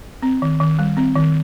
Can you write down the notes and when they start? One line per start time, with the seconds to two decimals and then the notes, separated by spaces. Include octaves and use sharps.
0.23 C4
0.42 D#3
0.60 D#3
0.79 G3
0.97 C4
1.15 D#3